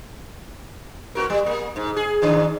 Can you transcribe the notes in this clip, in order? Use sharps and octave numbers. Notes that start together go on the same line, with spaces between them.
B3 F#4 A#4
G3
A#3
G#2
G#4
G#2 D#3 D4